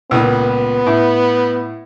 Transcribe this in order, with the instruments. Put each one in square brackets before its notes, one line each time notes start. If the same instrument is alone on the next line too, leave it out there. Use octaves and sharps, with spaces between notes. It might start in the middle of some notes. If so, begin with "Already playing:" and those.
[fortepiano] C#2 A#2 [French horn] B3
[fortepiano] A2